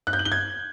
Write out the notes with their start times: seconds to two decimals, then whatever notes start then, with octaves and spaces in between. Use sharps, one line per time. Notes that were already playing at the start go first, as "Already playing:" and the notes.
0.07 F#6
0.13 G6
0.19 F#7
0.25 G7
0.32 G#6